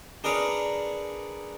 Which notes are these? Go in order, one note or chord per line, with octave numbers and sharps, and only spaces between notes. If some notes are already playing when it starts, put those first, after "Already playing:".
D4 G#4 A#4 B4 C#5 D5